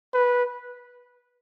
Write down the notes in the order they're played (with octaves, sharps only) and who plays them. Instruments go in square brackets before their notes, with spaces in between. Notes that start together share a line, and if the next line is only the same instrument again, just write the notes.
[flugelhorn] B4